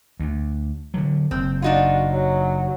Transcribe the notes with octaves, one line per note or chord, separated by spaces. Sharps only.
D2
D3 D#3 F#3
F#1 C4
D4 D#4 F4 F#4
F#3